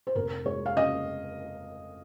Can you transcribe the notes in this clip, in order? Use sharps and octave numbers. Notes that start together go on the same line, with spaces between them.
C5
F1 A#4
G#3 C#5
F5
C#3 D#5